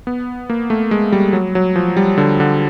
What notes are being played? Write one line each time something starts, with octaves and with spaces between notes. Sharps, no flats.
B3
A#3
A3
G#3
G3
F#3
F#3
F3
G3
D3
D3